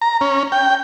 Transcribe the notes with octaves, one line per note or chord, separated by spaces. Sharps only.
A#5
C#4
G5